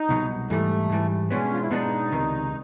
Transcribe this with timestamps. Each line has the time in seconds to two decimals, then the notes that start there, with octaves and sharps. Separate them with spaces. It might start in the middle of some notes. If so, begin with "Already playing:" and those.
Already playing: D#4
0.09 C2 B2 F#3
0.50 G#2 E3 G3 A3
0.90 G#2 E3 G3
1.30 B2 G#3 B3 C#4 D4
1.54 F4
1.62 E4
1.71 B2 G#3 B3 D4 D#4
2.12 C#2 C3 D#3